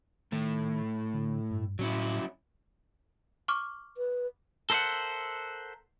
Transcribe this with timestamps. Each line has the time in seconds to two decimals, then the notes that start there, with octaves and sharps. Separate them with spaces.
0.32 A2 D#3 A3
1.14 D3
1.51 G2
1.79 A2 F#3 C#4 E4
3.48 C#6 D6 F6
3.97 B4
4.70 A4 A#4 C5 D5 E5 F#5